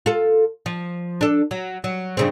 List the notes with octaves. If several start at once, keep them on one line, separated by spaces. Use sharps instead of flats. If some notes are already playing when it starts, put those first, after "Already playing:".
F4 A4
F3
D4 A4
F#3
F#3
G2 C#3 C4